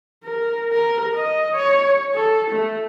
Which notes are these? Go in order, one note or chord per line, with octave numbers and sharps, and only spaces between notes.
A#4
A#4
D#5
C#5
A4
A3